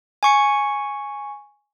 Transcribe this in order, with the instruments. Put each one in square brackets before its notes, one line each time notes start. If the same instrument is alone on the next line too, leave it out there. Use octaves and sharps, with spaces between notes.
[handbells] G#5 C#6 C#7